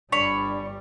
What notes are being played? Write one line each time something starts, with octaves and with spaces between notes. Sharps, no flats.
G1 G3 D4 C#5 B5 C#6